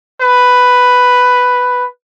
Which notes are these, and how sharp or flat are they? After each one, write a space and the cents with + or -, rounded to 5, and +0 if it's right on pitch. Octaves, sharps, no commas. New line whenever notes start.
B4 +5